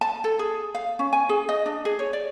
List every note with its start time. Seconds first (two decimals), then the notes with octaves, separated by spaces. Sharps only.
0.01 A5
0.24 A4
0.39 G#4
0.75 F5
0.99 C#4
1.13 G#5
1.29 G#4
1.49 D#5
1.66 D4
1.85 G#4
1.99 C#5
2.13 D5